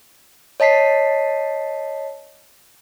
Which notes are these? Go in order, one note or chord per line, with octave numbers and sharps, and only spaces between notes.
C#5 D#5 A5 B6 C7